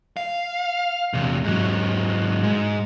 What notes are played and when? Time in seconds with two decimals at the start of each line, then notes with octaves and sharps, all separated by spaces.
0.17 F5
1.14 E2 C3
1.44 G#2 F#3
2.43 G#2